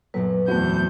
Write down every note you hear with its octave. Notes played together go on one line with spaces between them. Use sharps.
B1 F#2 A#2 F#3 B4
E2 A3 B3 C4 F#4 G6